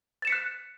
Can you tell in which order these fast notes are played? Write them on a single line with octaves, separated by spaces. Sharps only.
A6 E7 C#7 B6 F#6